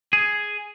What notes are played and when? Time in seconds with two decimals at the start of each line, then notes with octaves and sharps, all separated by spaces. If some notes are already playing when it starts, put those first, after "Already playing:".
0.13 G#4